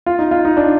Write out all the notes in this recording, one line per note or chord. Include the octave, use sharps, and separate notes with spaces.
F4
D#4
F4
D#4
D4